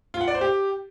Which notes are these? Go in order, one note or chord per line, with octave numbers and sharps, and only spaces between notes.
F4
F#5
D5
C5
G4